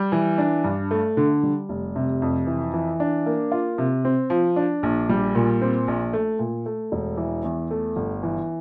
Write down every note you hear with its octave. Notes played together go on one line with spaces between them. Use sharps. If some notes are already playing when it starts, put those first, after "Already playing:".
Already playing: G3
E3
D4
G2
A3
D3
G3
F1
C3
F2
E3
E3
D4
A#3
F4
C3
C4
F3
D4
A#1
G3
A#2
C4
A#1
A3
A#2
A3
E1
E3
E2
A3
G1
E3